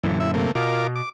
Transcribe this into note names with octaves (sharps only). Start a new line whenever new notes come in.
F#2 A#2 D3 E3
E4 E5
C3 A3 A#3
B2 F4 A#4 D6
D6